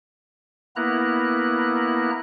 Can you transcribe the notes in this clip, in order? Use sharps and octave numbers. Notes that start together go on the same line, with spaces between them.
A#3 B3 E4 A#5 F#6